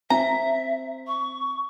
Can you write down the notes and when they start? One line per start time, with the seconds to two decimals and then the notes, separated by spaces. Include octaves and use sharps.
0.10 C4 E5 A#5
1.07 C#6